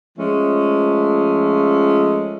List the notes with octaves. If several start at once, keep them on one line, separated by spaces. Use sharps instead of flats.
F3 G#3 A3 C#4